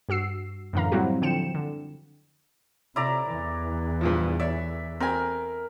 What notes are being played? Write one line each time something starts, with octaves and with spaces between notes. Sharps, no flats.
G2 F#4 E6 C7
F#2 A2 D3 E3 F5 A#5
F#3 G3 C4 E4 F#4 G4
D3 F3 G5 C#7 E7
D3
C3 E4 D5 A#5
E2 E3
G2 A#2 F3
C#5 D5 E5
C4 A#4 G#5